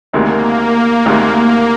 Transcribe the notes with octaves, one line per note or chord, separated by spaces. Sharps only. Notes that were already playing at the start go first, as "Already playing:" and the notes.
D2 C3 D#3 G#3 A#3
D2 C3 D#3 G#3 A#3
A#3